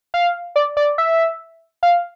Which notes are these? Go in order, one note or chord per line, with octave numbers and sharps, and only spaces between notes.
F5
D5
D5
E5
F5